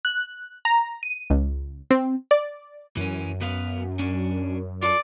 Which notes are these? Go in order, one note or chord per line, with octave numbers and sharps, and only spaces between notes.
F#6
A#5
D#7
C#2
C4
D5
F#2 E3 C#4
B3 B4 F5
C#4 D4
F4 A4 D5